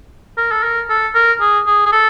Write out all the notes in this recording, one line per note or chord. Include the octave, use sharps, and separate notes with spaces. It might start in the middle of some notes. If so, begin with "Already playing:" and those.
A#4
A4
A#4
A4
A#4
G#4
G#4
G#4
A4